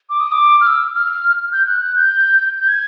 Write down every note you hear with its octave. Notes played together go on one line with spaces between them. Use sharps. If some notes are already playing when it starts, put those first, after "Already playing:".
D6
D#6
D6
F6
E6
F6
G6
F#6
F#6
G6
G6
G#6